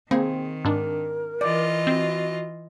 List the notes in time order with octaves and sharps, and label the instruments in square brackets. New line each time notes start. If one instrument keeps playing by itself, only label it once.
[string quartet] D#3 [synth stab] A#3 G#4 [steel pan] C4
[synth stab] G#2 D4 [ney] A#4
[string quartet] E3 F4 D#5 [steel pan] D5
[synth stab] C4 [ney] F#4